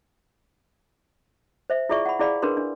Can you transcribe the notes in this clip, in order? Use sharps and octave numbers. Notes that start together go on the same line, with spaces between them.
C5 E5
E4 F4 G#4 D5 E5 C#6
F#5 B5
E4 G#4 D5 F5 B5
D4 G#4 A#4 B4 C6
D4